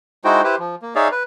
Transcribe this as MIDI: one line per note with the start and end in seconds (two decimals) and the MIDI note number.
0.25 0.42 56
0.25 0.42 63
0.25 0.42 64
0.25 0.42 66
0.25 0.42 72
0.25 0.42 79
0.44 0.56 64
0.44 0.56 67
0.44 0.56 71
0.44 0.56 72
0.59 0.75 53
0.82 0.94 58
0.95 1.08 63
0.95 1.08 68
0.95 1.08 73
0.95 1.08 74
0.95 1.08 76
0.95 1.08 77
1.12 1.23 71